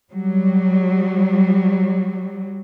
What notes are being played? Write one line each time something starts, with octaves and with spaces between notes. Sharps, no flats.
F#3 G3